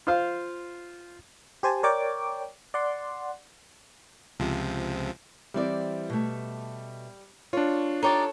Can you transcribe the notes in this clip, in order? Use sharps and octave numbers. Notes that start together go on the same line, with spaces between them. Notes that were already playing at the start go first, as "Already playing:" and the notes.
F4 C5 F5
G4 C5 G#5 A5
A#4 C#5 D5 G5 D6
D5 F#5 C6
C#2 C3 F3
E3 G3 C4 D5
B2 A3
D4 F4 C#5
D#4 G4 A4 C#5 D5